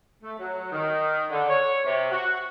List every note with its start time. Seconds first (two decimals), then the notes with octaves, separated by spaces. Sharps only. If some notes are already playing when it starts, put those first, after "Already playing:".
0.23 A3
0.39 F#3
0.72 D#3
1.31 D3
1.49 C#5
1.86 C3
2.12 F#4